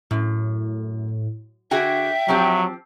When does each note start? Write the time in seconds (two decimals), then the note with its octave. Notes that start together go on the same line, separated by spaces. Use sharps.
0.11 F#2 A2
1.71 D3 F#4 G#4 E5 G5
2.28 F3 F#3 C4 G4